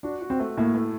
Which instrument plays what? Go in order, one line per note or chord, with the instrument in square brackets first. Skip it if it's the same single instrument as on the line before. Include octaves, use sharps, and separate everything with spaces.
[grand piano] D4 [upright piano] F#4
[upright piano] F#4
[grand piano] C4
[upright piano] A3
[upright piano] A2 [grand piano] A#3
[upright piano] A3